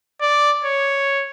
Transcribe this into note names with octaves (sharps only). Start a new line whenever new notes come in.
D5
C#5